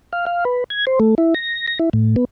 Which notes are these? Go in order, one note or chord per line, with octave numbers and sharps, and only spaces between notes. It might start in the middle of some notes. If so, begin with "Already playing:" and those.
F5
F5
B4
G#6
C5
A3
E4
A#6
A#6
E4
A2
B3